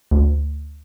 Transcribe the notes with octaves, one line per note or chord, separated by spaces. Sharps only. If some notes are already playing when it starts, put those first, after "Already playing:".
D2